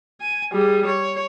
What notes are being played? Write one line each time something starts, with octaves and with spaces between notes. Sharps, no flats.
G#5
G3 G#4
C#5